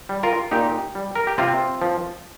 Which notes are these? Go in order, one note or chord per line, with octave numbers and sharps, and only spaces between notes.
G3
F4 A#4
A#2 D#4 G4
G3
A#4
G4
C3 C4 F4
F3